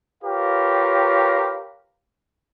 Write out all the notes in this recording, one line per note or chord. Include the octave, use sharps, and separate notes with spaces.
F4 G4 A#4 B4 C#5 F5